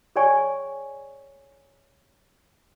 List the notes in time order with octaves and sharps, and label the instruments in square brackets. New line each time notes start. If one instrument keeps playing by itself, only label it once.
[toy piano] G#4 C#5 D5 G5 G#5 C#6